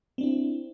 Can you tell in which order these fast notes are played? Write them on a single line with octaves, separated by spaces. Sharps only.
C4 D4 E4